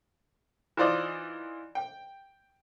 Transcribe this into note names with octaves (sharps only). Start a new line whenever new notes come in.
E3 D#4 F4 C5 D5 D#5
G5